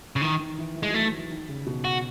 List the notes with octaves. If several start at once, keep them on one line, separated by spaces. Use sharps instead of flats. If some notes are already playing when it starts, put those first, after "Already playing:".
C#3
D#3 E3
D#3
E3
E3
G#3
F#3
A3
D#3
E3
D#3
C#3
B2
F#4